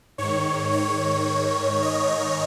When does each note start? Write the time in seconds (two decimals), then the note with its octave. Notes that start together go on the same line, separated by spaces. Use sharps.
0.18 G#2 D#3 C#5
0.73 C#5
1.82 D#5